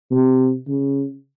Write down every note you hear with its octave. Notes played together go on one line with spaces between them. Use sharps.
C3
C#3